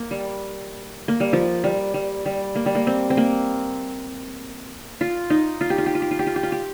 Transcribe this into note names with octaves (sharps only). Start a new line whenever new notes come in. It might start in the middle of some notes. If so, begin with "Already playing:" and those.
Already playing: A#3
G3
A#3
G3
F3
G3
G3
G3
A#3
G3
A#3
C4
C4
A#3
F4
D#4
F4
G4
F4
G4
F4
G4
F4
G4
F4
G4
F4
G4